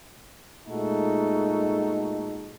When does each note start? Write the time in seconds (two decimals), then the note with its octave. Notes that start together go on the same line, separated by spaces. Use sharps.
0.68 A#2 G#3 A3 D#4 F#4 A4